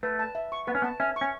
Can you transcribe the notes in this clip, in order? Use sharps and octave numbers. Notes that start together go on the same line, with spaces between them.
A3 B4
A5
E5
C#6
B3 B4
C#4
B3 A5
C#4 E5
C#6
C#4